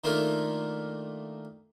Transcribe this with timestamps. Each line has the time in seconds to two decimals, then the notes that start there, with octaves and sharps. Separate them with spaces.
0.04 D#3 A3 A#3 D4 D#4 F4